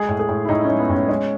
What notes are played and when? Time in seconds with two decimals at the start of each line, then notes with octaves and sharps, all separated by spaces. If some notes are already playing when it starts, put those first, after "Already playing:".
Already playing: G#3 G#4
0.09 A2
0.19 G#4
0.29 A2
0.45 E4
0.49 A2 D#4
0.65 G#3 C#4
0.80 B3
0.89 A2 C#4
1.08 G#3 C#4